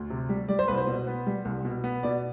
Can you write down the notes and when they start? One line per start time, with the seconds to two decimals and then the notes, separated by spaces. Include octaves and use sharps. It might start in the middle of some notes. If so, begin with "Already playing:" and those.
Already playing: D2
0.10 C3
0.29 G3
0.48 G3 D5
0.59 C5
0.68 C2 B4
0.78 C5
0.87 B2
1.07 B3
1.27 G3
1.45 C2
1.65 B2
1.84 B3
2.03 B2 D5